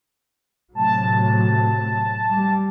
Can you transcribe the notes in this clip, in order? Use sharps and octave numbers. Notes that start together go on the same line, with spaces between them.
A2 C3 F#3 A5
G3